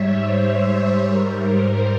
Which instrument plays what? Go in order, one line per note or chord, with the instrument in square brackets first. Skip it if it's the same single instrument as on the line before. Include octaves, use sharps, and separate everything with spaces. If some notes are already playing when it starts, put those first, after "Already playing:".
Already playing: [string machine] G#2 G3 C#5 E5
C5
G#2 G3 A#4
C5